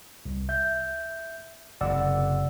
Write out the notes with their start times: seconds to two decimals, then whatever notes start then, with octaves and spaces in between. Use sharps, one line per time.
0.25 C2
0.49 E5 G6
1.81 F#1 C3 D5 F#5 E6